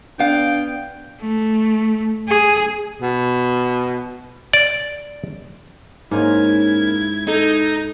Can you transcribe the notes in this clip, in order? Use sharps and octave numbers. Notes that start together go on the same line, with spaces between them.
B3 D4 F5 G5
A3
G#4
B2
D5
G#2 A#3 C#4 D#4 E4 G#6
D#4 A4